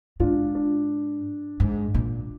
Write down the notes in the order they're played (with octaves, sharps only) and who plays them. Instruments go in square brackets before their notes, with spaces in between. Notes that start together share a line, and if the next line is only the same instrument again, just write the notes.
[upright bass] G#2 [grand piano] D4 F4
[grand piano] D4
[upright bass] G#2
A#2